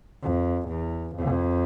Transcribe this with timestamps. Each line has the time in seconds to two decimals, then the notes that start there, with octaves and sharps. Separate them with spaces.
0.22 F2
0.68 E2
1.16 F2